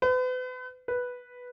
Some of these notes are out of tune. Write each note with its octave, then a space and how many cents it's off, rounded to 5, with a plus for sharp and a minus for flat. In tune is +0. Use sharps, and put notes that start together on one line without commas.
B4 +40
B4 -5